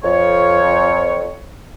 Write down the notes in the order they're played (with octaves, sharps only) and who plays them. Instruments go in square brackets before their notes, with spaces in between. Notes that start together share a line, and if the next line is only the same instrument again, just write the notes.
[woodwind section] F2 C#5